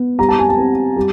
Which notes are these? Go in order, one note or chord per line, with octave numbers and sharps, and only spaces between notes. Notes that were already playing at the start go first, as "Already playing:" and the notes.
Already playing: B3
G3 A#5
A5
G#5
A5
C4
G3